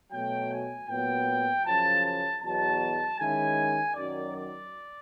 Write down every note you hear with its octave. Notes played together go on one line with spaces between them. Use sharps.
B2 F#3 A3 G5
G#5
A#2 F#3 B3 G5
F#2 C#3 F3 A5
A5
E2 B2 F#3 A5
D#3 G#3 C#4 E4 G#5
F#2 D#3 F#3 D5
D5